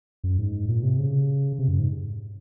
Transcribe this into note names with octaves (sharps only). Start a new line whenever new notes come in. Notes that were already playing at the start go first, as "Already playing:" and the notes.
F#2
G#2
A#2
C3
C#3
C3
F#2
G#2